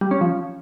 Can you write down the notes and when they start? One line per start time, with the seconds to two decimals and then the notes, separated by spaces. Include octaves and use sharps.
0.01 G3
0.11 C#4
0.21 F3